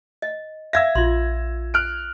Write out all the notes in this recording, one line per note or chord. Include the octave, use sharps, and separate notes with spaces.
D#5
E5 F5 E6 G#6 A#6
A#1 F4 C6
F6 F#6 D7